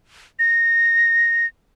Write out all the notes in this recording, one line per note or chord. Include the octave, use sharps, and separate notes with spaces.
A#6